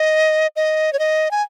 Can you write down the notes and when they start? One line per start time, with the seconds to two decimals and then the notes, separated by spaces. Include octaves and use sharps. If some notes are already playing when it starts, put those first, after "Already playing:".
Already playing: D#5
0.56 D#5
0.93 C#5
0.99 D#5
1.31 G#5